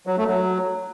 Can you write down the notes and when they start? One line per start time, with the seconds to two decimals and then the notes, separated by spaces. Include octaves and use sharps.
0.07 F#3
0.17 A3
0.28 F#3